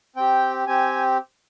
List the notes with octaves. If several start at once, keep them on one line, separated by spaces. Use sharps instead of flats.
C4 G4 G5
C4 G4 G#5